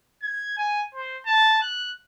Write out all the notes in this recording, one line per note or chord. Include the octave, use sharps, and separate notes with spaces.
G#6
G#5
C5
A5
F#6